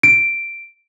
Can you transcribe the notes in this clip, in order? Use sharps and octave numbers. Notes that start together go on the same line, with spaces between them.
D7